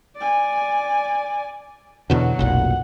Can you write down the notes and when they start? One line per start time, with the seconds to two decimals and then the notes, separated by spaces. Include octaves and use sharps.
0.16 D5 G#5
2.10 E2 B2 D3 F#3
2.39 F1 B1 A#2 F#5